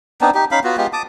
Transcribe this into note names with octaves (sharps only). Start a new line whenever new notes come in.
B3 C4 D4 D#4
D#4 G4
C#4 D#4 F5 B5
B3 F4 F#4
G#3 B3 F4 G4
A5 D6 D#6